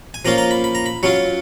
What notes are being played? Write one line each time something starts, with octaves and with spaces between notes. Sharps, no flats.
G#5
F3 A#3 C#4 F4 A#5
A#5
B5
B5
A#5
B5
F#3 C#4 F4 C#5